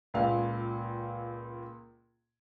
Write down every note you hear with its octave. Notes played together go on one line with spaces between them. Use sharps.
C#2 A#2 F5